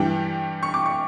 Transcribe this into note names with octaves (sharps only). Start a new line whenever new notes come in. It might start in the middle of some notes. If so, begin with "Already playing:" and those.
Already playing: G2 E3 G3 G5
C#6
D6
C#6